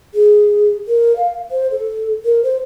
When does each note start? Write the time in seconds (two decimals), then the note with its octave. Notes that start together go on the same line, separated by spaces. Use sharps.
0.14 G#4
0.88 A#4
1.16 F5
1.51 C5
1.71 A4
2.25 A#4
2.43 C5